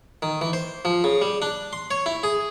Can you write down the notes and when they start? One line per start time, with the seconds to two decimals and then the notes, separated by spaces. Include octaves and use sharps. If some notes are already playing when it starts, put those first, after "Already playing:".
0.22 D#3
0.41 E3
0.53 C5
0.85 F3
1.04 C#3
1.22 G3
1.42 D4
1.73 C6
1.91 C#5
2.06 E4
2.23 G#4